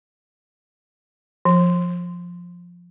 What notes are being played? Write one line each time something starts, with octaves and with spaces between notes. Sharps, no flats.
F3